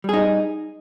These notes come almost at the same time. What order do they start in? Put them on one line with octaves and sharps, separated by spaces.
G3 G#4 D#4